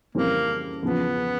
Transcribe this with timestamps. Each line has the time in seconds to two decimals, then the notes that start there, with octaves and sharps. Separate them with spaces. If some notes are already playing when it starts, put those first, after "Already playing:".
0.15 F2 C#3 E3 G3 A#3 C4
0.83 E2 C#3 F3 B3